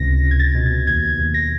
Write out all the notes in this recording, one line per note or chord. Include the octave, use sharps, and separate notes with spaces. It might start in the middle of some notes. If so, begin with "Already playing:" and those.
Already playing: C#2 C3 A#6
C#2
G#6
A6
B2
D#2 G#6
D#2
A#6